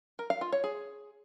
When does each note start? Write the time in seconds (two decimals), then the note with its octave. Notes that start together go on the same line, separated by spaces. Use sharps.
0.19 A#4
0.30 F5
0.41 F4
0.52 C#5
0.64 G#4